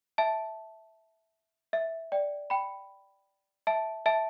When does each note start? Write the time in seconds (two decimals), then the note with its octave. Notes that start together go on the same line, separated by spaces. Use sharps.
0.18 E5 A5
1.73 E5
2.12 D5 G5
2.50 G5 B5
3.67 E5 A5
4.06 E5 A5